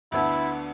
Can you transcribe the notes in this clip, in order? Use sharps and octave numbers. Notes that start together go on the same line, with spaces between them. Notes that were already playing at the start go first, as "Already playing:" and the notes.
D2 D3 B3 D4 E4